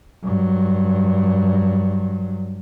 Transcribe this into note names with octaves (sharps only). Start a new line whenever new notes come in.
G2 F#3